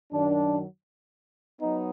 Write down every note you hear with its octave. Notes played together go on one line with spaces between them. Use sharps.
F#2 D#3 F#3 D4
F#3 B3 D#4